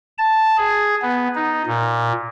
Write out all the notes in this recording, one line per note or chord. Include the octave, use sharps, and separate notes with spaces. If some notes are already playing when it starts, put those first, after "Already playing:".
A5
G#4
B3
D#4
A#2